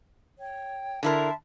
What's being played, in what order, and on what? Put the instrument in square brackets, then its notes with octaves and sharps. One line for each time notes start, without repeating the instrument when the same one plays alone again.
[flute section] C#5 G5
[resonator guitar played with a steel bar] D3 E4 A#4 [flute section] E5 A5 C6